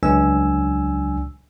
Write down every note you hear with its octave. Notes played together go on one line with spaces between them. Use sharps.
C#2 F#3 D4 G#5 E6